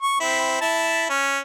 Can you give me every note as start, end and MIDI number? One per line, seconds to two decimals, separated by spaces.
0.02 0.19 85
0.20 0.60 60
0.20 0.60 64
0.61 1.07 64
0.61 1.07 81
1.10 1.39 61